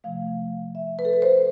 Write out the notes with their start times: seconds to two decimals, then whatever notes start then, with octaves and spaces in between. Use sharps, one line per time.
0.04 C3 F3 A3 F5
0.75 E5
0.99 B4
1.05 A4
1.13 B4
1.22 C5